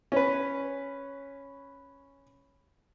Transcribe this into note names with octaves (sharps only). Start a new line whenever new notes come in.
C#4 B4